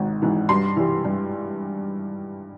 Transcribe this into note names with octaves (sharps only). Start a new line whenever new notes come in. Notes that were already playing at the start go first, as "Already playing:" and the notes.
Already playing: G#1 G#2
G#2 E3
G2 C6
E3 G3
G2